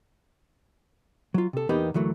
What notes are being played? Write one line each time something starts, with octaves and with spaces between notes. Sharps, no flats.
F#3 F4
C3 A4
E2 A#3 B3 D#4 G4 B5
D2 E3 F#3 A3 A#3